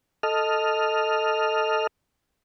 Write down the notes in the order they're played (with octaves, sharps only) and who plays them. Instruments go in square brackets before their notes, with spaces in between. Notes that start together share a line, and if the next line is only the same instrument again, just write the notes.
[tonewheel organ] A4 D#5 F6